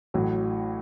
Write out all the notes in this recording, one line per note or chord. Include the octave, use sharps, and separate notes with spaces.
A1 A2 F#3